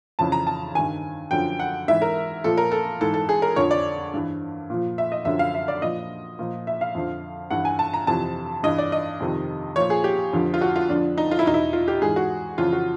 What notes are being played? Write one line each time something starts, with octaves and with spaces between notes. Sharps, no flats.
F2 C#3 E3 A5
A#5
A5
G2 D#3 G#5
F#2 D3 F3 G5
F#5
G#2 E3 E5
A#4
A#2 F3 A4
A#4
A4
G#2 E3 A4
A4
G#4
A#4
F2 D3 F3 C#5
D5
G2 E3
A#2 F3
E5
D#5
F#2 D3 F3 E5
F5
E5
D5
A#2 F3 D#5
A#2 F3
E5
F5
F2 D3 F3
G2 E3 F#5
G#5
A5
A#5
F2 C3 E3 A5
G2 E3 D#5
D5
D#5
F2 C3 D#3
A#2 F3 C#5
G#4
G4
F2 D3 F3
F4
F#4
F4
F2 D3 F3 D4
D#4
F4
E4
E2 B2 D#4
E4
F4
G4
G#2 E3 G#4
F#4
F2 C#3 E3 F4
F#4